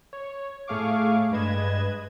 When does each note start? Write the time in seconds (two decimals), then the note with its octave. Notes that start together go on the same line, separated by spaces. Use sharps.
0.13 C#5
0.68 A2 A3 G#4 F5 C#6 D6
1.31 G2 G#3 B4 D#5 G#6 E7